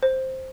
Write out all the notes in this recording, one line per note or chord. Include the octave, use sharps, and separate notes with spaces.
C5